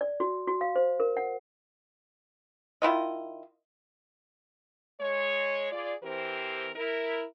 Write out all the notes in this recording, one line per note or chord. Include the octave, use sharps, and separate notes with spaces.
D5
F#4
F#4
F5
C5
A#4
F#5
D#3 E4 F4 D#5
G#3 C#5
F4 G#4 D5
E3 C4 G4 A#4 C5
E4 A#4